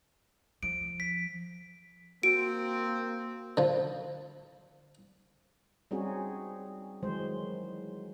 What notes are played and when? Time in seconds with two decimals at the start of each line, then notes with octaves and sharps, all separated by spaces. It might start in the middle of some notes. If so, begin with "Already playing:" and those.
0.63 F3 D7
1.00 B6
2.23 A#3 C4 F#4 D7
3.57 D3 F3
5.91 G3 C4 C#4 D#4 F#4 G#4
7.03 D#3 E3 F#3 G#3 C5